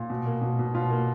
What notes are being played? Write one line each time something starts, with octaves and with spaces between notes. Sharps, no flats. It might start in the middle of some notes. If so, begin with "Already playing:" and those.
Already playing: A#2
B2
A#3
B2
B2
B2 F4
A#3